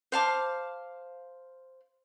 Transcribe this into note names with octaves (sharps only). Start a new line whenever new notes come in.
C5 F5 A5 D6